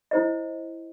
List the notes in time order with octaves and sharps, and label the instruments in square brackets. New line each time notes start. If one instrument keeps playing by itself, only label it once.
[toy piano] E4 C5 D#5